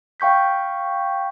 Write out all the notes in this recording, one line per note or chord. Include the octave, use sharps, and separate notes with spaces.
F5 G5 C#6 G6 B6